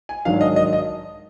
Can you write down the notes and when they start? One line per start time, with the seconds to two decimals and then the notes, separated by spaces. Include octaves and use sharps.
0.09 G#5
0.25 G#2 D#3 F#3 D4 F5
0.41 D#5
0.56 D#5
0.73 D#5